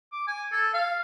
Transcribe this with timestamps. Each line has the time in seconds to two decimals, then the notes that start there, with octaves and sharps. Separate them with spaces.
0.12 D6
0.27 G#5
0.52 A4
0.74 F5